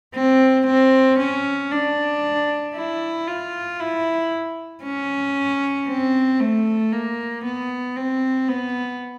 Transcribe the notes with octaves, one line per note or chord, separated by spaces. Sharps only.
C4
C4
C#4
D4
E4
F4
E4
C#4
C4
A3
A#3
B3
C4
B3